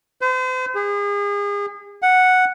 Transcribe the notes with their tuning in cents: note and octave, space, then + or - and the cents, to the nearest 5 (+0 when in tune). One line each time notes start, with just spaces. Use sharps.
C5 -40
G#4 -35
F#5 -5